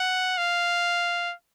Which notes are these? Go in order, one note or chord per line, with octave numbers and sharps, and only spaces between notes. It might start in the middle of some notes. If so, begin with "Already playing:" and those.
Already playing: F#5
F5